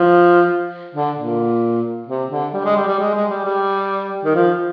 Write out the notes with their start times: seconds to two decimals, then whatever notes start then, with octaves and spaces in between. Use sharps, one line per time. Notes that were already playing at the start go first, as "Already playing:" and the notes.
Already playing: F3
0.95 D3
1.17 A#2
2.08 C3
2.30 D3
2.54 G3
2.65 G#3
2.76 G3
2.88 G3
3.00 G#3
3.14 G#3
3.30 G3
3.45 G3
4.25 D#3
4.35 F3